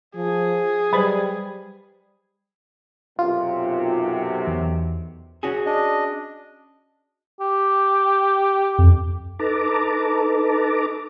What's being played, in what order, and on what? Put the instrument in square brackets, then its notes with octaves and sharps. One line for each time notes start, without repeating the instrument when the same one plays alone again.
[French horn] F3 [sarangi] G#4
[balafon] F#3 B4 C5 [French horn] G3 [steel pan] B5
[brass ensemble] B1 F#2 C3 [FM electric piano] F4
[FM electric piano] E2
[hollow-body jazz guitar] C#4 F#4 G#4
[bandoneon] D4 D#5
[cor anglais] G4
[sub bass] F2
[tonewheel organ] D#4 A4 B4 A5 A#5 D6